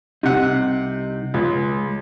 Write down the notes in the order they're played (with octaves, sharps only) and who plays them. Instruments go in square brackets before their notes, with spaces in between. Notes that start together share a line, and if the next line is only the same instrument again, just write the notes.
[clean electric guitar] C2 D#4 [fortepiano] C3 F#5
[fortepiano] C#2 [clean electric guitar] G#3